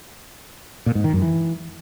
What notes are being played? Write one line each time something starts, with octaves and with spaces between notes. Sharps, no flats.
A#2
G#2
D#3
F#2
E3